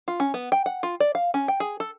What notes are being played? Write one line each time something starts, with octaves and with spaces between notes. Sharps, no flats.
F4
C#4
B3
G5
F#5
F4
D5
F5
C#4
G5
G#4
A4